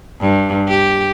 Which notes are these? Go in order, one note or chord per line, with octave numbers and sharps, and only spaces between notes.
G2
G4